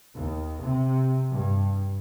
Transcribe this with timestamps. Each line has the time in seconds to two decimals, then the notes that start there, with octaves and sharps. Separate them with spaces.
0.13 D#2
0.61 C3
1.32 G2